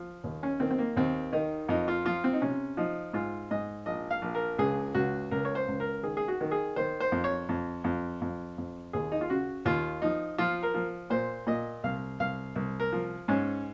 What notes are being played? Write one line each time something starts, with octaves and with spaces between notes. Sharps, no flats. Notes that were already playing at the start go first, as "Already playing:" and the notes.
Already playing: F3
D#2
C#4
D#3 C4
C4
A#3
D#2 C4
D#3 D#4
F2 D#4
F4
F3 F4
C4
D#4
C3 C#4
F3 D#4
G#2 F4
G#2 D#5
A#1 D#5
F5
A#1
A#4
C#2 G#4
C#2 F#4
C#2 A#4
C#5
C5
C#2
A#4
D#3 G#4
G#4
F#4
D#3
G#4
D#3 C5
C5
F2
C#5
F2
F2
F2
F2
D#2 G#4
D#4
F4
C#3 F#4
D#2 F4
F3 D#4
F3 F4
A#4
F3
A#2 C5
A#2 D#5
C2 F5
C2 F5
C2
A#4
F3
G#2 C#4